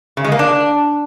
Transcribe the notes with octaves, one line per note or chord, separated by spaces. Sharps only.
C#3
G#3
A#3
D4